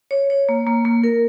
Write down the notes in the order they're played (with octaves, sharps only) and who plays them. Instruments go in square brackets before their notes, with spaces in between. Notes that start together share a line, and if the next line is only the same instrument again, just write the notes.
[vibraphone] C#5
C#5
A#3
A#3
A#3
A#4